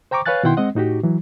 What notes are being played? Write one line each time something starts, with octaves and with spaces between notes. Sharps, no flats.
C5 G5 A#5 C#6 D6
B4 C#5 F5 G#5 F#6 A6
B2 D#3 E4 F#5 G5 C6
G#3 C4 D#5 F#5
A2 D#4 F#4 G4
E3 F#3